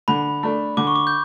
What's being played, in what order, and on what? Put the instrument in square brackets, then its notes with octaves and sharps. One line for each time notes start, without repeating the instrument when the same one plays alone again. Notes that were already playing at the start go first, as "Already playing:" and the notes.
[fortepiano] D3 [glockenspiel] B5
[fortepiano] A3 D4
[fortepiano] D3 [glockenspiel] D6
[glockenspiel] C#6
D6
G6